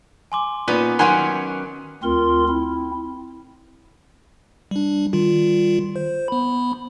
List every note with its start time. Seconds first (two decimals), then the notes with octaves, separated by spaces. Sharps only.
0.32 G#5 C6 D6
0.68 A#2 B3 C#4 D#4 F#6
0.99 D#3 F#3 C#4 F#5 G#5 C6 C#7
2.03 D2 C4 F4 A#4 C6
2.48 C4 E4
4.71 G3 D4
5.13 D#3 G3 F4
5.96 C5
6.28 B3 B5